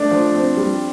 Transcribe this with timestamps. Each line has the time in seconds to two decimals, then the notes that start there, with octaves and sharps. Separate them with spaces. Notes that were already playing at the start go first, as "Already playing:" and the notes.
Already playing: A3 D4 D5
0.11 F3
0.34 C4
0.57 G3